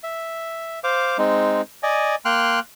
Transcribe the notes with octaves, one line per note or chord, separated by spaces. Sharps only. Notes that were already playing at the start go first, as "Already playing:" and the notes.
E5
C5 F5 D6
G#3 C4 D#4
D5 D#5 G#5
A#3 G5 C6 F6 F#6